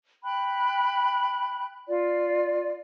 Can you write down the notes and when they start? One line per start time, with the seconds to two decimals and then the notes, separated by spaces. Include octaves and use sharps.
0.25 G5 B5 F#6
1.87 F4 D5